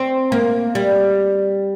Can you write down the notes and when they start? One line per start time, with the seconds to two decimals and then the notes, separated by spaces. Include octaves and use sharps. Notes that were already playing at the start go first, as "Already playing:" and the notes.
Already playing: C4
0.32 A#3
0.75 G3